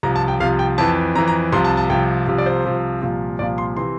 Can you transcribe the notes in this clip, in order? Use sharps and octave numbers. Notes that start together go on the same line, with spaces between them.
C2 C3 F3 A#5
A5
G5
C2 C3 F3 F5
G5
F2 E3 A5
F2 E3 A#5
A#5
C2 C3 F3 C6
A5
A5
C2 C3 F3 G5
C2 C3 F3
D5
C5
C2 C3 F3
C2 A#2 F3
C2 A#2 F3 D5
C6
C3 E3 C6